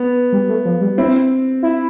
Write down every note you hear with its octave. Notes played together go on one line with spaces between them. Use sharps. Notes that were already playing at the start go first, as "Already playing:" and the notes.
Already playing: B3
G3
A3
F3
G3
C4 E4
E4